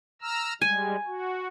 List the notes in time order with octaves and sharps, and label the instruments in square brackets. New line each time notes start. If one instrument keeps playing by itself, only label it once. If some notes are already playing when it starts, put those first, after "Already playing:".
[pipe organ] A#5 E6 F6
[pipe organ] G3 G#3 [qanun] G#5
[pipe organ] F#4